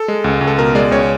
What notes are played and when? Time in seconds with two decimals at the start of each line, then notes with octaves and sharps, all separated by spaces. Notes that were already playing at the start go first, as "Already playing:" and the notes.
Already playing: A4
0.08 G#3
0.24 C#2
0.41 C#2
0.47 A4
0.58 B2 A#4
0.75 G#3 D5
0.91 C#2 C#5